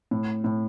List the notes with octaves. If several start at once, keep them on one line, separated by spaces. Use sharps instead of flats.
A2
A2